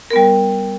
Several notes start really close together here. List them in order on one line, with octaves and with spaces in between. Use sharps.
A#4 B3 G3